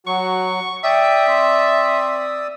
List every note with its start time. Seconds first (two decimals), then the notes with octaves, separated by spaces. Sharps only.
0.07 F#3 F#4 C#6
0.84 D5 E5 G5 D#6 E6
1.28 C4